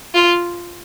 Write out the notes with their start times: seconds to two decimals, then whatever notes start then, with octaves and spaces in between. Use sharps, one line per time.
0.14 F4